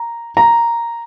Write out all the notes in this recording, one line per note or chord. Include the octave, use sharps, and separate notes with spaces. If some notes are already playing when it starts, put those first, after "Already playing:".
Already playing: A#5
A#5